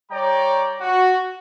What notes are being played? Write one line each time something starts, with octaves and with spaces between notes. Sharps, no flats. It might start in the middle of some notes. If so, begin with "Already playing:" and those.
G3 C#5 D5 G5 A#5
F#4